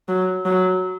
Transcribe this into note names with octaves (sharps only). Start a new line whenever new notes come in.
F#3
F#3